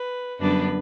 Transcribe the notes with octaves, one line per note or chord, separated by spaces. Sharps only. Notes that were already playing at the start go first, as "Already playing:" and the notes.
Already playing: B4
F#2 D3 G3 B3 D4 B4